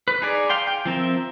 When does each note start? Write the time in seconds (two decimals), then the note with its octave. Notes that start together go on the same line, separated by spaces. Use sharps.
0.08 B4
0.22 D#4 G#4 D5
0.50 F5 G5 C6
0.67 G5
0.85 F3 C4 A#4 E5